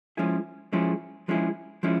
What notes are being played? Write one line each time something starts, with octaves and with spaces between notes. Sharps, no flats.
F3 G#3 C#4 E4 G#4
F3 G#3 C#4 E4 G#4
F3 G#3 C#4 E4 G#4
F3 G#3 C#4 E4